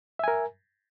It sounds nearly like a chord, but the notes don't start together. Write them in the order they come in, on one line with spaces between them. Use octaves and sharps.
E5 G#5 A#4